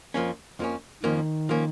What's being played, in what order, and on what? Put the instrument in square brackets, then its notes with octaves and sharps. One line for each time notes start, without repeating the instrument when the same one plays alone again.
[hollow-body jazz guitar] F2 F3 A#3 C#4
F2 F3 A#3 C#4
[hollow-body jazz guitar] F2 F3 A#3 C#4 [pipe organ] D#3
[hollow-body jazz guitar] F3 A#3 C#4